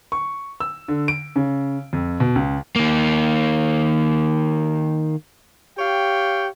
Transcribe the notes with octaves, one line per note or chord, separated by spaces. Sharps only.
C#6
E6
D3
D7
C#3
F2
B2
C#2
D#3 A#3
G4 C#5 F5 G5